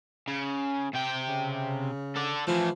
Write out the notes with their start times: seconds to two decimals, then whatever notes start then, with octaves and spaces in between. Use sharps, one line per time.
0.28 C#3
0.93 C3 G5
1.28 C#3
2.16 A4 D5
2.47 E3 F3 A3